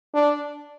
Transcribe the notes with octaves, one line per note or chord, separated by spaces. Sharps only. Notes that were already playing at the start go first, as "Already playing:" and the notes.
D4